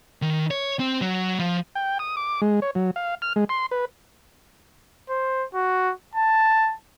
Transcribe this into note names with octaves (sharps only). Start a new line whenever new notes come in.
D#3
C#5
C4
F#3
F3
G5
D#6
D6
G#3
C#5
F#3
F5
F6
G#3
C6
B4
C5
F#4
A5